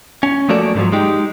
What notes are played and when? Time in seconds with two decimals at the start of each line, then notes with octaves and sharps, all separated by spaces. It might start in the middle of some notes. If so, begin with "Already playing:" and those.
0.23 C#4
0.49 F3 A3 A#3 F#4 A4 D5
0.75 G#2 D3 D#3 F3 F#3
0.92 G#3 D#4 G4